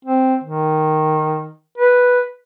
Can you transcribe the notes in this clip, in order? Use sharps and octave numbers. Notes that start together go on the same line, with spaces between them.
C4
D#3
B4